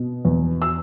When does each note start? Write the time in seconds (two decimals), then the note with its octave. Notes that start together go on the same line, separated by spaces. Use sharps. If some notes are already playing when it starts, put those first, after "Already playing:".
Already playing: B2
0.25 E2
0.62 E6